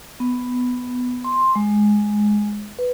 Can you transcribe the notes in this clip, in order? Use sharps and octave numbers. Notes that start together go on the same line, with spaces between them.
B3
C6
G#3
B4